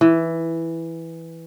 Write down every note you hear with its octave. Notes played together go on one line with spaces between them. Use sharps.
E3